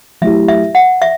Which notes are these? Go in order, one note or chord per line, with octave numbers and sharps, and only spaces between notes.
F#3 A3 E4 G4 E5
E5
F#5
E5